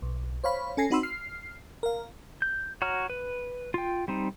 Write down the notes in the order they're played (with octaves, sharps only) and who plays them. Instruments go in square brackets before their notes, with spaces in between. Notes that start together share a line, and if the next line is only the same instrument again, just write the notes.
[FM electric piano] B1
C5 C#5 F5 B5
C#4 A4 G#5 A#6 C7
C4 D#4 F#4 B5 C6 E6
F6 C7
A#4 F5
[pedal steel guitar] G6
F#4 C#5 A#5 F6
B4
F4 G5
G3 C4 D#4